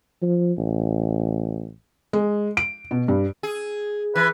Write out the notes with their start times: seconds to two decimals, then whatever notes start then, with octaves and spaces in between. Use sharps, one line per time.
0.22 F3
0.58 A1
2.13 G#3
2.57 D7
2.91 B2
3.08 G2
3.43 G#4
4.16 E3 B4